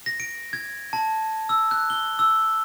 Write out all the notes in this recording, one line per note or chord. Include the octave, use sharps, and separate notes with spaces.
A#6
D7
G#6
A5
E6
F#6
G7
E6